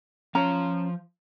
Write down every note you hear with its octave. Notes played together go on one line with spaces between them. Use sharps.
F3 C#4 F5 A#5